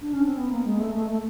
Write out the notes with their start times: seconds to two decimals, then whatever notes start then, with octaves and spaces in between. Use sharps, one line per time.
0.01 D4
0.13 C#4
0.25 C4
0.38 B3
0.50 A#3
0.65 G#3
0.80 A3
0.95 A3
1.11 A3